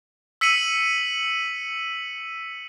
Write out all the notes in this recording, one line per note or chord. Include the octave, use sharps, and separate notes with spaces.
E6 B6 C#7 D#7 F#7